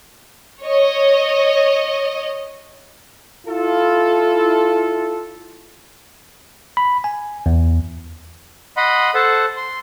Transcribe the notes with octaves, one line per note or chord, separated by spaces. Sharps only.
C#5 D#5
E4 F4 A4
B5
G#5
E2
D#5 F#5 B5 C6
A4 C5 F#5 A5
C6